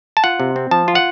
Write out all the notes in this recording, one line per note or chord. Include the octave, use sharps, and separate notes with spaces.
A5
F4 F#5
C3
C4
F3 A5
F4
F#5